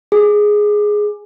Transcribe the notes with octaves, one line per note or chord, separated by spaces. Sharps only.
G#4